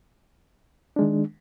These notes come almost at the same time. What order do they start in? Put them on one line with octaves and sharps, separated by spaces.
D4 G#3 D#3